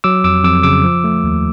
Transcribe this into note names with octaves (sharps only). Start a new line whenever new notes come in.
F#3 D6 E6
F2 D6 E6
F2 D6 E6
C#3 D6 E6
F3
A3
D#2